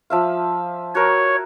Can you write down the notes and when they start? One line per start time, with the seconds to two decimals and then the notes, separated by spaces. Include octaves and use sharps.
0.10 F3 E5 F5
0.95 F#4 A#4 C#5